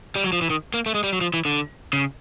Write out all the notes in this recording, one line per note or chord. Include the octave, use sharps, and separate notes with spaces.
G3
F#3
F3
E3
D#3
A#3
A3
G#3
G3
F#3
F3
E3
D3
C#3